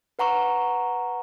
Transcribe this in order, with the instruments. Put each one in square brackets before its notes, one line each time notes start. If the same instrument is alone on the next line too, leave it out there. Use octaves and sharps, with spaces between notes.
[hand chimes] B4 F#5 A#5 C#6